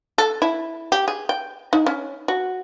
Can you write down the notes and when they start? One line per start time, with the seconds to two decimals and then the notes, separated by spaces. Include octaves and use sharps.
0.18 A4
0.42 E4
0.92 G4
1.08 G#4
1.29 G5
1.73 D#4
1.86 C#4
2.28 F#4